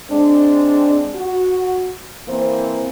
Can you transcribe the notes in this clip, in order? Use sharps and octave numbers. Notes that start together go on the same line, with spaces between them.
G#3 C4 D4
F#4
E3 A#3 C4 C5